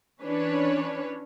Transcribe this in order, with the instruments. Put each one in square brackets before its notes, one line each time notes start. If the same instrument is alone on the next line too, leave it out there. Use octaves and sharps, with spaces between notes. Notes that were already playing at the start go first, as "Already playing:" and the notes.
[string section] E3 C#4 D4 B4 C#5